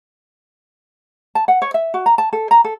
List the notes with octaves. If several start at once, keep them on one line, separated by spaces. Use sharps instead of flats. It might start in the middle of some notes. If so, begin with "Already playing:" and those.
A5
F#5
C#5
E5
F#4
A#5
A5
A4
A#5
A4